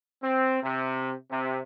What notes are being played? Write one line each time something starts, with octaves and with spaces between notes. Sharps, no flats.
C4
C3
C3